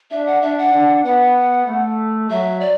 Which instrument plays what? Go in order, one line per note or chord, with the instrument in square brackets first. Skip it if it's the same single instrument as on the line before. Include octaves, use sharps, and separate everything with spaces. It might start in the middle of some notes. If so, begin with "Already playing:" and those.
[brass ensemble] D4 [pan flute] E5
[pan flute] F#5
[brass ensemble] D4 [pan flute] E5
[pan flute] F#5
[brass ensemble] D4
[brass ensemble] B3 [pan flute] F#5
[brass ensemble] A3
[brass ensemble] F#3 [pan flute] E5
[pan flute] D5